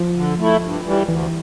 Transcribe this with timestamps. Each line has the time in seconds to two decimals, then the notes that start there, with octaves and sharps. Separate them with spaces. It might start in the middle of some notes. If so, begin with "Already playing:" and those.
Already playing: F3
0.16 D3
0.39 A3 E4
0.62 G2
0.85 E3 G3
1.08 D2 E3